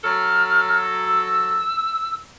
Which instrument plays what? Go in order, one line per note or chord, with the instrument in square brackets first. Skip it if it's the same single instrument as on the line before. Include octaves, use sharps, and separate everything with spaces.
[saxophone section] F#3 A4 [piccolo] F6
[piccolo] E6